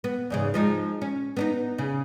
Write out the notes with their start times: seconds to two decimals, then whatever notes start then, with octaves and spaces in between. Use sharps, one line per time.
0.04 B3
0.30 E2 G#2 C#3
0.54 F3 G#3 D#4
1.02 C#4
1.37 B3 D4 D#4
1.78 C#3